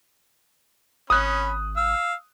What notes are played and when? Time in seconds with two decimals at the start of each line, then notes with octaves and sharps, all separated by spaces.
1.10 G#1 C#4 B5 D#6 F#6
1.77 F5 E6